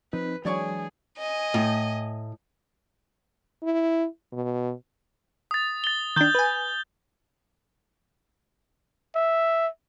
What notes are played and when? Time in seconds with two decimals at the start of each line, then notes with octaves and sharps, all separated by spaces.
0.13 F3 C4 D#4 B4
0.45 E3 F#3 G#3 D4 G#4 C#5 D5 C#6
1.17 D#5 G#5
1.54 A2
3.63 E4
4.33 B2
5.51 D#6 A6
5.84 A6 G7
6.16 D#3 D4 G6 G7
6.35 B4 G#5
9.15 E5